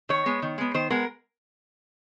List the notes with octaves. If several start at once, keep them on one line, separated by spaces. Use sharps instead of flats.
D#3 C#5
G#3 B3
D#3
G#3 B3
D#3 C5
G#3 B3 A#4